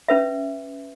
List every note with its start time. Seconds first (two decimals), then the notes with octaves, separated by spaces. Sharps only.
0.08 C#4 B4 E5